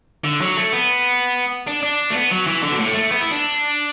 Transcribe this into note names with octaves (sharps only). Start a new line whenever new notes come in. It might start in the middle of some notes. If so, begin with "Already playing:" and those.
D3
F#3
A3
B3
D4
D4
A3
B3
F#3
E3
D3
B2
A2
A3
B3
E4
D4